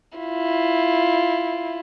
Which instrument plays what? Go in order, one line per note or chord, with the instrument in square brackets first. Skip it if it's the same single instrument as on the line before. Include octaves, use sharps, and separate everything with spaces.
[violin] E4 F4